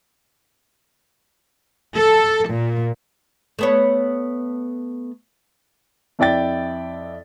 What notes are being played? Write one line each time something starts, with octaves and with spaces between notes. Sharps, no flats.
A4
A#2
A3 B3 C#5
F2 E4 D5 G5 A6